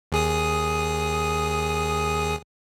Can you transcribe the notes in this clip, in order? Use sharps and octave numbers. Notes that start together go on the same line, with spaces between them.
D#2 G#4 D#6